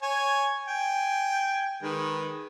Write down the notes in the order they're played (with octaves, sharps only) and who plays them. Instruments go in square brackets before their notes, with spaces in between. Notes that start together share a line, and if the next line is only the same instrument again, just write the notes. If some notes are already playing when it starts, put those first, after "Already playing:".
[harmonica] C#5 G#5
G5 G#5
D#3 G#3 B4